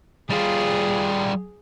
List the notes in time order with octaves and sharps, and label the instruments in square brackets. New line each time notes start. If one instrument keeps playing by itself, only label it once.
[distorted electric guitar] G3 F4 [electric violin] G#4